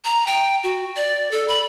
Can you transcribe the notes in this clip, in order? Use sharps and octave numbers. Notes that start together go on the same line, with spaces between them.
A#5
G5
F#4
D5
A4
B5